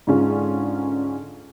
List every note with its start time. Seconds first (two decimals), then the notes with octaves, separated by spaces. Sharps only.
0.07 G#2 D3 C#4 F4